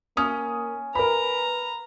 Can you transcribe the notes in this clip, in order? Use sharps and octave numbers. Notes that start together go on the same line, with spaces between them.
A#3 C#4 D#6
A#4 B4 A#5 B5